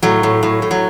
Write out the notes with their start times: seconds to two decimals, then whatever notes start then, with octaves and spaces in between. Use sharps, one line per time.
0.02 A2 F#3
0.23 A2
0.43 A2
0.62 A2
0.71 F#3